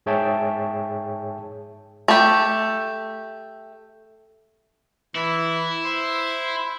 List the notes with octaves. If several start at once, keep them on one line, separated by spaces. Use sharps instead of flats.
G#2 G#4 C#5 E5 G5 A5
A3 G4
E3 E4
C5